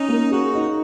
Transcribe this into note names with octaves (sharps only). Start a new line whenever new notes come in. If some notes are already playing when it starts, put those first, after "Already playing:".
Already playing: C#4 D#4
A#3
F#4 G#4
D#4